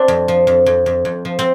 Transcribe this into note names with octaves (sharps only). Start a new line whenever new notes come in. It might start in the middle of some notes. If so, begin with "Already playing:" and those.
Already playing: C4 D4
F2
F3
F2
F2
F2
F2
F3
C4